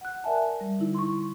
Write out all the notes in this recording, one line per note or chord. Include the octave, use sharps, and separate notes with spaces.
F#5 F#6
A#4 D5 E5 G#5 A5
G3
D3 D#4 E4
C6 C#6